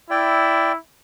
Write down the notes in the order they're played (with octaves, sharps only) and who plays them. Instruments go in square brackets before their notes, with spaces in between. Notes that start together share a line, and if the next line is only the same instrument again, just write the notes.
[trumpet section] E4 [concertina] D5 G5